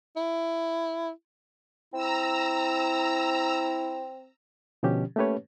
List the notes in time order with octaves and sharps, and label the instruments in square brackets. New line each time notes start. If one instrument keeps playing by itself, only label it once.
[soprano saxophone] E4
[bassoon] C4 [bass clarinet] E4 [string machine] A#5 E6
[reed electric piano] B2 D3 F3 C#4 G4
A3 A#3 C#4 G4 B4 C#5